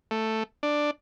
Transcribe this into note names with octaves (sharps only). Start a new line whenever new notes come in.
A3
D4